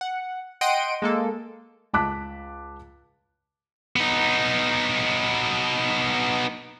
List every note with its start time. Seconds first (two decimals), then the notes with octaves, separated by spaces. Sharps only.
0.01 F#5
0.61 D#5 F#5 G5 C6 D7 D#7
1.02 G#3 A#3 A4
1.93 C#2 A5 D6 F#6 B6
3.96 B3 D#4